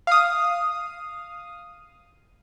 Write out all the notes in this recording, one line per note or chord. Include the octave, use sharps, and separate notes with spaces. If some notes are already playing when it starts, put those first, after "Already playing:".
F5 D#6